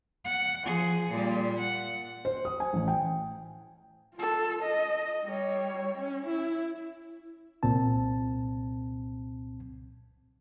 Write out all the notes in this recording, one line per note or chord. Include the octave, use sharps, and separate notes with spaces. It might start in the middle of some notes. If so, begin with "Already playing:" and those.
F#5
F3 G#4
A#2 G3
F#5
C5
D#6
G#5
A1
G5
F4 A4
D#5
G3 C#5
C#4
E4
C2 A#2 C4 A5